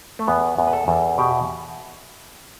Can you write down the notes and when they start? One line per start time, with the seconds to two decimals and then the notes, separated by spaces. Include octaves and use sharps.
0.19 A3
0.28 E2 B3
0.58 E2
0.67 B4
0.73 A4
0.88 E2
1.18 B2 G4